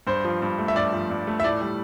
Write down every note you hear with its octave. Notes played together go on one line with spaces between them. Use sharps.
G2 C5
F3
G2
A3
E5
G2 D5
F3
G2
A3
E5
A2 D5
G3